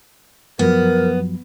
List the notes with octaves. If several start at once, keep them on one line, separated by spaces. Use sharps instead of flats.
F#2 F3 F#3 B3 A#4